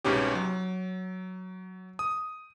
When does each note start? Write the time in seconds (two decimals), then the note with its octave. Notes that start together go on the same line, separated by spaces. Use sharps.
0.04 C2 G#2 B2 C#4 G4
0.35 F#3
1.99 D#6